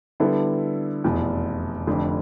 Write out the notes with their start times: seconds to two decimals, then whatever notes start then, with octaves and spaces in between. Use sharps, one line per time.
0.20 D3 G3 B3 E4 A4
1.04 F1 E2 B2
1.87 F1 F2 D3